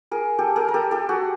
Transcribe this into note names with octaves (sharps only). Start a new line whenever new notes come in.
G#4 A#4
G4 A4
G#4 A#4
A#4
G4 A4
G4 A4
F#4 G#4